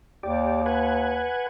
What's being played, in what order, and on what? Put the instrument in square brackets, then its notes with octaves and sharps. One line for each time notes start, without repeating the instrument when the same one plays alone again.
[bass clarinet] D#2 [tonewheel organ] G4 D5
[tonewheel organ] B4 F#5 G#5